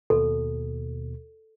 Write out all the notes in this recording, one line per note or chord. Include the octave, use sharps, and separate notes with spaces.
D#2 B2 A4